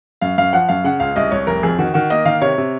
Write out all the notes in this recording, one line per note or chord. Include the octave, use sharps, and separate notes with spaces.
F#2 F5
F#2 F5
F3 F#5
F#2 F5
C#3 F#5
C#2 F5
C2 D#5
C2 C#5
F1 A#4
F2 G#4
D#3 F#4
D#3 F#4
A#3 D#5
D#3 F5
C3 C#5
C3